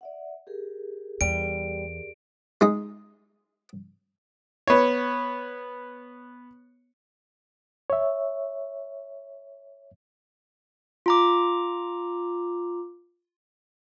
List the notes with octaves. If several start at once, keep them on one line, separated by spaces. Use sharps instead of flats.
D5 E5 F#5
G4 G#4 A#4
E2 G3 D7
G#3 D#4
B3 C#5
C#5 E5
F4 A#5 D6